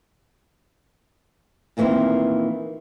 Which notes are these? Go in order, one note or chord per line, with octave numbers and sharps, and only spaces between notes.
A#2 D#3 E3 A3 A#3 C4